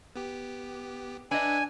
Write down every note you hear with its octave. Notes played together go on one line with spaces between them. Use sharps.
B3 G4
D4 B4 D#5 E5 F#5 G#5